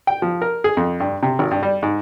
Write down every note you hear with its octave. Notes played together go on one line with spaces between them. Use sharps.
G5
F3
A#4
G#4
F2
G2
C3
G#1
G2
G3
G#2